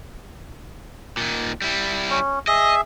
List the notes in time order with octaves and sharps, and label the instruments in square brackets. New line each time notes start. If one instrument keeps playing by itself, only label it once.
[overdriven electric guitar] A#2 D#3
G3 E4
[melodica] C#4
[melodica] G#4 E5 [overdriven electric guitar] D#5